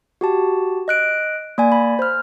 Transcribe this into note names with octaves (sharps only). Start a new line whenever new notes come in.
F#4 G4 A5
D#5 F#6 D7
A#3 D5 G#5
B5
C5 F6